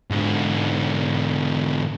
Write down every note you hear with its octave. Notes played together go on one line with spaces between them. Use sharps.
G#2 D3